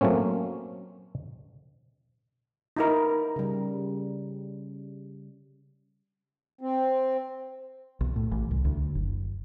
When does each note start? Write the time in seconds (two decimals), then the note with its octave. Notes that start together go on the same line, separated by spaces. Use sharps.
0.01 F#3 A3 A#3 C4 C#4
2.77 D#4 E4 A#4
3.36 C#3 G3
6.61 C4
8.01 B1
8.16 A2
8.32 A1
8.51 C2
8.65 D2
8.95 F#1